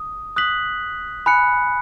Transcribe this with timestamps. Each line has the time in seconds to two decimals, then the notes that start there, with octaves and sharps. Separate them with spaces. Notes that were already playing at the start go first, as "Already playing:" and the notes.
Already playing: D#6
0.36 D#6 F#6 B6 F#7
1.26 G#5 B5 F#6 C#7